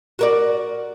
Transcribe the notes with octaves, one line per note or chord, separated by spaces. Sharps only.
F#4 A#4 D5